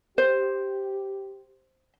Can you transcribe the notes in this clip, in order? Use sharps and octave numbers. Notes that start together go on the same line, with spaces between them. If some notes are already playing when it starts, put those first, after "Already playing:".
G4 C5